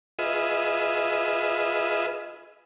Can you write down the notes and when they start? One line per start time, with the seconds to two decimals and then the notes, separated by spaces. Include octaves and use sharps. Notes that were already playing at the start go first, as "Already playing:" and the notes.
0.19 F4 G#4 B4 D#5 E5